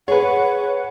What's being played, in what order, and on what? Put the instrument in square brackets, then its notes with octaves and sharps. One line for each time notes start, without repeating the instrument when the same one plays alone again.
[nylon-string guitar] G#4 [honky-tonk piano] B4 C#5 [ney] F#5